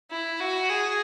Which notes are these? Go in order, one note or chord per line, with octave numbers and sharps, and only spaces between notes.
E4
F#4
G#4